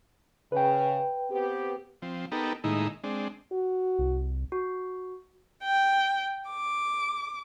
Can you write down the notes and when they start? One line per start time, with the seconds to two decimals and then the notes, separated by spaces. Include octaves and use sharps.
0.52 C#3 B4 G5
1.30 B3 C4 G4
2.02 F3 C4
2.32 B3 D#4 G4 A4 A#4
2.64 A2 D#3 G#3 A#3 D#4 E4
3.04 G#3 C4 D4
3.52 F#4
3.99 C2
4.52 F#4
5.64 G5
6.50 D6